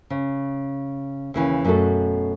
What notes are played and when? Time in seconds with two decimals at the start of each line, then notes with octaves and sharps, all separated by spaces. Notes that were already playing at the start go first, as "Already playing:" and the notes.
0.10 C#3
1.34 D#2 C#3 E3
1.64 F#2 B2 A3 F#4 A4